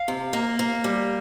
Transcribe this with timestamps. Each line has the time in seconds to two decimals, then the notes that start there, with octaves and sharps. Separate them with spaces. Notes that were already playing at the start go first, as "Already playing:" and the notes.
Already playing: F5
0.08 C3
0.33 A#3
0.59 A#3
0.84 G3